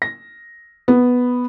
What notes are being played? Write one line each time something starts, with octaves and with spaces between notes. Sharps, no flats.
A#6
B3